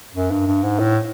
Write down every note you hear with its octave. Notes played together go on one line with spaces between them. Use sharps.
F#2
G2
G2
G#2
A2